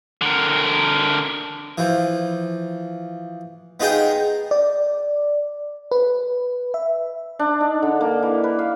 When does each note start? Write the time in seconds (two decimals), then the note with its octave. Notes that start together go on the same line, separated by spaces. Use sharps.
0.21 D3 A#4
1.78 E3 F3
3.80 B3 D#4 F4 G#4 D#5 G5
4.51 D5
5.92 B4
6.74 E5
7.39 D4
7.61 D#4
7.82 D3
8.01 A#3
8.23 E3
8.44 B4
8.59 F5